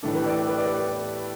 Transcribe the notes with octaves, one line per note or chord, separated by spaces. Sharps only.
A2 E3 A3 D4 A4
G4 B4
A4 D5
B4
D5
G4 B4